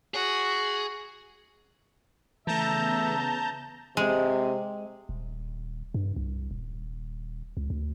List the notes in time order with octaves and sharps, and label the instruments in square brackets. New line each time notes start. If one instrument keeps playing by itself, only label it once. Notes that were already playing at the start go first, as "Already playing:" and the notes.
[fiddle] F#4 [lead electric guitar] G#4
[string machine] C#3 B3 [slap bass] E3 A3 [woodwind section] E5 [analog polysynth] A5 A#5 G6
[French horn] C3 [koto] G#3
[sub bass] D#1
G2
C2
D#1
C#2
D2